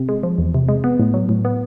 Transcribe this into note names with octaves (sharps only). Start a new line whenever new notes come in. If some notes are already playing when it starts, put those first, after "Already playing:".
Already playing: C3
G#3
F3
E2
C3
G#3
B3
A2
F#3
A2
B3